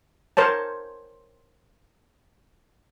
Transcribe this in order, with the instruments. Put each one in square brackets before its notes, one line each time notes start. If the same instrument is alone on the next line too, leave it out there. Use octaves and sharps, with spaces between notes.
[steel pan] A#4 C5 C#5 A5